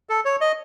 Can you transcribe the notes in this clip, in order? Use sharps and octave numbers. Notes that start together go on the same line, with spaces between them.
A4
C#5
D#5